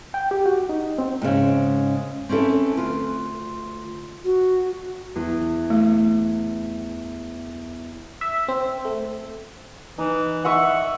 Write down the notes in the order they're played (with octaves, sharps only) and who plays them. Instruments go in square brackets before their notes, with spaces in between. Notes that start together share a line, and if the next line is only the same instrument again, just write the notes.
[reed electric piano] G5
G4
F#4
D#4
C4
[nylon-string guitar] G#2 C#3
C4 C#4 E4 A4 B4
D2 F4 B4
[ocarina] F#4
[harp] E2
[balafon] A3
[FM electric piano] E5
C4
A3
[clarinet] E3 [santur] D#4
[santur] D#5 E5 C#6 [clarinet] F#5